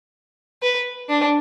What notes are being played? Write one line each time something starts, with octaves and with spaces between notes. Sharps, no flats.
B4
D4